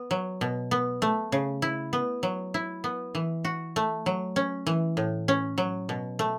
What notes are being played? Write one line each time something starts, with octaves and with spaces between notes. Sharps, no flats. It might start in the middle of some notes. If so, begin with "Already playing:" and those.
Already playing: B3
F#3
B2
B3
A3
C#3
E4
B3
F#3
E4
B3
E3
F#4
A3
F#3
C#4
E3
A2
C#4
F#3
B2
A3